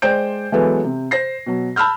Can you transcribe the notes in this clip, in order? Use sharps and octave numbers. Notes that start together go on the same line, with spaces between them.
G#3 C5 D5 G5 G6 D7
E3 F#3 G#3 B3 A4
C3
C5 A#6 C7
B2 F#3
A5 B5 E6 F6 G6